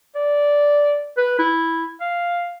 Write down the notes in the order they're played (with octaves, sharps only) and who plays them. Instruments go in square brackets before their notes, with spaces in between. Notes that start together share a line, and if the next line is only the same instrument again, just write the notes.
[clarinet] D5
B4
E4
F5